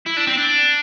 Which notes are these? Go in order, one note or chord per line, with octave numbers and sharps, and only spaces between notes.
E4
D4
C4
D4